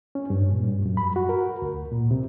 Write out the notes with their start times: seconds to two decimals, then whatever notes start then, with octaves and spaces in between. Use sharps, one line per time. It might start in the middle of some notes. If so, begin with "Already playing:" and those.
0.15 C#4
0.30 G2
0.51 A#2
0.67 G2
0.86 F#2
0.97 B5
1.16 F#4
1.29 A#4
1.62 D2
1.92 A#2
2.11 C3